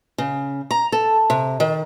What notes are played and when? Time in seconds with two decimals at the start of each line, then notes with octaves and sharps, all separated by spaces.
0.18 C#3
0.71 A#5
0.92 A4
1.30 C3
1.60 D#3